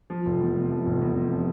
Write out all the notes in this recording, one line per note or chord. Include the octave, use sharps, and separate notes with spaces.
F3
F1
E2
C3
F3
F1
E2
C3
F3